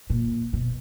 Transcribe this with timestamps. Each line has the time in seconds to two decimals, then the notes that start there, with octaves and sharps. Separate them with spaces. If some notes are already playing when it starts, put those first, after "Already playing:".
0.10 A#2
0.53 B2